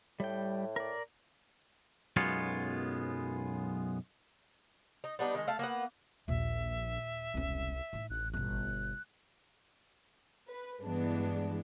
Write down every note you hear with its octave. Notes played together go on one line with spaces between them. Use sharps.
A2 G3 G5
A#4 D5
B1 F#2 G#3 B3 F4 C#5
D#4
G3 B3 D4 D#4
D#3 G#3
A3 F5 A5
A#3 B3 F#5
A#1 D#2 A#2 E5
E1 C2 C#4
A2 D#4
A1 F#6
G1 B2 F#6
B4
G2 E3 G#3 B3 D4